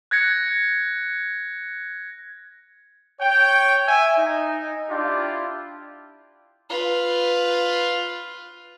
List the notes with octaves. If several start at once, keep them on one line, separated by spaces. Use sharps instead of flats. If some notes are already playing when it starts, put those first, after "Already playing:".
F#6 G#6 A#6 C#7
C#5 G5
E5 G#5
D#4
D4 E4 F4 G4
F4 B4